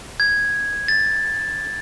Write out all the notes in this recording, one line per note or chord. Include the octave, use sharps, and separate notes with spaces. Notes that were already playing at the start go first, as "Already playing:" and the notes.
G#6
A6